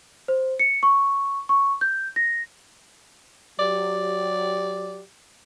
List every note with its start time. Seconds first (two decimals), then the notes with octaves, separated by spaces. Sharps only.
0.28 C5
0.60 C#7
0.83 C#6
1.49 C#6
1.81 G6
2.16 A#6
3.59 F#3 G4 D5